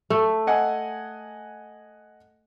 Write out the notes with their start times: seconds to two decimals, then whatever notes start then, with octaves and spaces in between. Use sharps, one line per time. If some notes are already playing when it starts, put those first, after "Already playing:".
0.10 A3
0.47 D#5 F#5 G#5